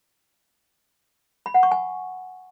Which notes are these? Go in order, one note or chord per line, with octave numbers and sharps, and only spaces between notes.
B5
F#5
C#6
G#5